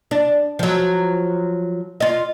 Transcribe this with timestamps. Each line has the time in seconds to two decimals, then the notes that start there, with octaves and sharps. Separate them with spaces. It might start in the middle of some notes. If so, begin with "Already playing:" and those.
0.11 D4
0.59 F3 F#3
2.00 F4 D#5